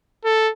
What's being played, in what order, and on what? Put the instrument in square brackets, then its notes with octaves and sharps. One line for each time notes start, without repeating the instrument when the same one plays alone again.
[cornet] A4